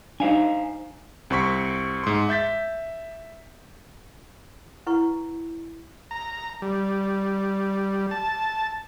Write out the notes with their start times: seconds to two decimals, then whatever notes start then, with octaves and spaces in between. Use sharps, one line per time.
0.20 D4 D#4 C5 F5 G#5
1.30 C2 C4 C6 C#6 B6
2.04 G#2 C6
2.29 E5 G6 A6 B6
4.86 E4 B4 F#5 C#6
6.11 A#5
6.62 G3
8.11 A5